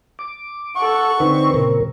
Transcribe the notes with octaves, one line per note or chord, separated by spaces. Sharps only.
D6
A4 F#5 C#6
D3 C4 D#4 B4
A#2 C#3 A#4